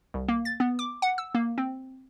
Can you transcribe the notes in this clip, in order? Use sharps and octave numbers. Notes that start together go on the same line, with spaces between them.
C2
A#3
A6
B3
D6
F#5
E6
A#3
C4